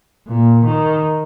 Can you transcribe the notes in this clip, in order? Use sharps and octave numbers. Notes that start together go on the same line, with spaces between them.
A#2
D#3